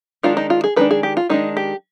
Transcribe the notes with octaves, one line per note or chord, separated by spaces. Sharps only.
D#3 G#3 D4 F4
D#4
F4
G#4
D#3 G#3 D4 B4
G#4
G4
F4
D#3 G#3 D4 D#4
G4